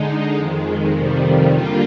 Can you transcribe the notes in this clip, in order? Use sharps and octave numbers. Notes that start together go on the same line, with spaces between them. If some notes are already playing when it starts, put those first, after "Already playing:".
Already playing: D3 G#3 D#4
F2 D#3 G#3
F2 C3 D#3 G3
D3 G3 A#3 F4